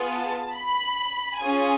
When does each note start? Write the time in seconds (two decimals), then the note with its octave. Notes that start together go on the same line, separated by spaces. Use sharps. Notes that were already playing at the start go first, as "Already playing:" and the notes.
Already playing: B3 F4 G#4
0.13 A5
0.55 B5
1.41 C#4 F4 G#4 G#5